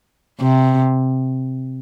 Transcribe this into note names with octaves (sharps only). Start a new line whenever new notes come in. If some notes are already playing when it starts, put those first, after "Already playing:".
C3